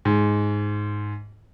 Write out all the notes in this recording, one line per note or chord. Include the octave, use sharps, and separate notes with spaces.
G#2